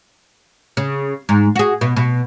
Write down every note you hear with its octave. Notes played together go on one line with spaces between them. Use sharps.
C#3
G#2
F#4 G#4
B2
B2